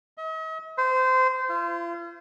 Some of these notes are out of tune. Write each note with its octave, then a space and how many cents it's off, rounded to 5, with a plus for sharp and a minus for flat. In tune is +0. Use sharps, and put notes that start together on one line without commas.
D#5 +45
C5 -20
F4 -40